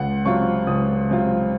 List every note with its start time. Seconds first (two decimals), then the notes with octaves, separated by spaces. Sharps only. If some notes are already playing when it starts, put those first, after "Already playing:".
Already playing: C#2 F#5
0.25 C3 F#3 C4 F4 C#6
0.67 C#2 D#6
1.10 C3 F#3 C4 F4